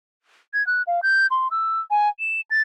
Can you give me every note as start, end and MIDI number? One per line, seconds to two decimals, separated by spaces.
0.54 0.65 92
0.67 0.82 90
0.87 1.00 77
1.03 1.27 91
1.31 1.48 84
1.51 1.80 88
1.91 2.08 80
2.19 2.41 100
2.51 2.62 93